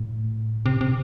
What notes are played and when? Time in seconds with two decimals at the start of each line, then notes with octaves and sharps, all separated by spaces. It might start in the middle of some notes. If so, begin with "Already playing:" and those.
Already playing: A2
0.66 C3
0.81 C3